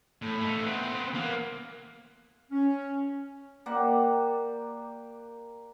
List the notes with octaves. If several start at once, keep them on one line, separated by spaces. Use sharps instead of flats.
A2
A3 D#4
B3 C4
A#3 B3
C#4
A#3 G4 D5 F#5